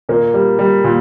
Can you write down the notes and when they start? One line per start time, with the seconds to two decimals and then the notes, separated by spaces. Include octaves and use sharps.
0.09 A#2 A#3
0.34 G3
0.59 G3
0.84 A#2